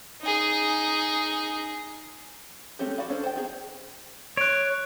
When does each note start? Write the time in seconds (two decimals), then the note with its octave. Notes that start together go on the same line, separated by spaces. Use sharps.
0.21 D#4 G#4
2.79 G#3 A3 C4 C#4 G4
2.97 F#4 D5 F5 B5
3.10 C#4 D4 A4 C5 D5
3.23 C5 G5
3.35 B3 C4 D#4 G#4
4.37 C#5 F#6 D7